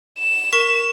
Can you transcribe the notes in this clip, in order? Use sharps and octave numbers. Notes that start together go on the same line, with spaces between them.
E7
A#4 C#6 B6